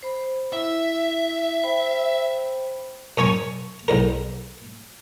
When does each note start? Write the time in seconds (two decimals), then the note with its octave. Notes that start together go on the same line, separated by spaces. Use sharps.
0.03 C5 B5
0.53 E4 E5
1.63 C5 G5 B5
3.18 F#2 C#4 C#5 G#5 C#6
3.88 B1 E2 A#4